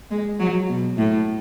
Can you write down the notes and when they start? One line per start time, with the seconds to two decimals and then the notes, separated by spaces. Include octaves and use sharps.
0.11 G#3
0.39 F#3
0.69 B2
0.97 A2